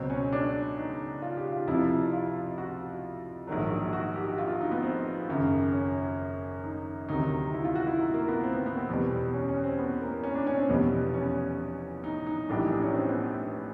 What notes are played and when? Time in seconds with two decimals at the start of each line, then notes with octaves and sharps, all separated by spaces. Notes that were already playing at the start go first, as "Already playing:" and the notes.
Already playing: C#2 B2 F#3 C4
0.10 C#4
0.32 D4
0.77 D#4
1.22 F4
1.37 G4
1.52 F4
1.67 F2 C3 F3 E4
2.13 F4
2.58 F#4
3.47 A#1 G#2 D#3 F#3
3.93 F#4
4.16 G4
4.31 F#4
4.38 F4
4.49 F4
4.61 D#4
4.72 B3
4.83 C4
5.28 G#1 F#2 C#3
5.73 C#4
6.64 D#4
7.09 D2 C3 D#3 F#3 D#4
7.54 E4
7.65 F4
7.75 F#4
7.87 E4
7.99 D#4
8.14 A#3
8.28 B3
8.43 C4
8.55 B3
8.66 B3
8.77 C4
8.89 E2 B2 G3
9.34 C#4
9.49 C#4
9.64 C4
9.79 B3
10.01 A#3
10.24 C#4
10.35 D4
10.47 C#4
10.58 C4
10.69 F1 E2 B2 G3 B3
11.14 C#4
12.04 D#4
12.27 D#4
12.49 A#1 A2 E3 G3 D4
12.60 D#4
12.72 D4
12.82 C#4
12.94 C4
13.09 B3